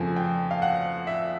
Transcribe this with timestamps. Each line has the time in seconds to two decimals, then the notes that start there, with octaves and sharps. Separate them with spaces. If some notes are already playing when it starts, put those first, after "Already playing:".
Already playing: F2 C#3 F3 A3 C4 G#5
0.16 G5
0.51 F5
0.62 F#5
1.07 E5